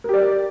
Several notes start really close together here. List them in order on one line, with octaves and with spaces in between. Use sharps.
A#4 G4 D5